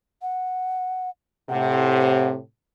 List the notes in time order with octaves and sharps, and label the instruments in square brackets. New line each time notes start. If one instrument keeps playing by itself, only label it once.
[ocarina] F#5
[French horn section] A2 C3 [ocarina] F#5